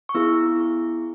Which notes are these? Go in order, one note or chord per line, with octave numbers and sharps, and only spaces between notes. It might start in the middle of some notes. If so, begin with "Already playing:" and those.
C#6
B3 E4 G#4 E6